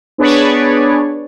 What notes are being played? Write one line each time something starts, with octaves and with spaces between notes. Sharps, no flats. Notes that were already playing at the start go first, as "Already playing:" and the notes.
B3 D4 G#4 B4 C#5 D5